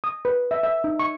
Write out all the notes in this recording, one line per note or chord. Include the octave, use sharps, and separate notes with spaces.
D#6
B4
E5
E5
D#4
C#6